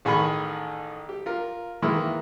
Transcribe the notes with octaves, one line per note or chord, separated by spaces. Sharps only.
A1 D#3 G#4 G#5 B5 C#6
G4
F4 A#4
D#3 E3 G#3 A#3 E4